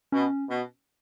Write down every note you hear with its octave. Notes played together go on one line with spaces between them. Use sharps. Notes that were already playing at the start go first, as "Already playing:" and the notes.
B2 C#4
B2